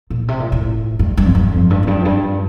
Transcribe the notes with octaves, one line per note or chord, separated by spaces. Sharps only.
A#2
C3
A#2
A2
G2
G2
F2
G2
F2
G2
F2
G2
F2
G2